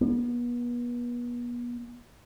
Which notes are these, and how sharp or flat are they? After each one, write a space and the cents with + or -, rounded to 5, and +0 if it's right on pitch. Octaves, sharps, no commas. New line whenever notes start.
B3 -35